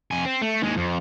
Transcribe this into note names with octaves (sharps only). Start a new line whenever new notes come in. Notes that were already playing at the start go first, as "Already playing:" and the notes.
F2 G#5
C4
A3
D#2 G#3
F2